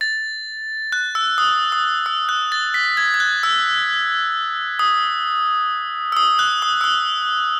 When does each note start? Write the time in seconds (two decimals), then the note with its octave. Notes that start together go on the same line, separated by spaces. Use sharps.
0.01 A6
0.92 F#6
1.15 E6
1.38 D#6
1.72 D#6
2.06 E6
2.29 F#6
2.52 A6
2.74 B6
2.97 G#6
3.14 G#6
3.20 F#6
3.43 E6
4.79 D#6
6.12 E6
6.17 D#6
6.39 F#6
6.62 D#6
6.81 E6
6.84 D#6